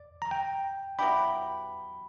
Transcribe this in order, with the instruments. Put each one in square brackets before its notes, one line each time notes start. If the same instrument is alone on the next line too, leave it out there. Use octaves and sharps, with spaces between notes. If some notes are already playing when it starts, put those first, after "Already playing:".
Already playing: [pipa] D5
[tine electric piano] A#5
G5
[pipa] F#3 B3 E4 G4 [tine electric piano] B5